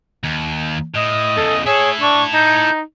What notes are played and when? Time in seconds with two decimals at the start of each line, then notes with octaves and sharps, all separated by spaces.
0.24 D#2
0.94 A2 D#5
1.37 E2 C#3 A4
1.66 E4 G#4 A4 C#5
2.00 D4 C#6
2.34 D#4 G6